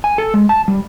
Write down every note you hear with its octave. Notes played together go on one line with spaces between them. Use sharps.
G#5
A4
G#3
A5
G3